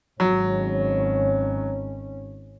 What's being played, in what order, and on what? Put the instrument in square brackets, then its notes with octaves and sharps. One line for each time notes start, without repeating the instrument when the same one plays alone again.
[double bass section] G#1 C#4 [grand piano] F#3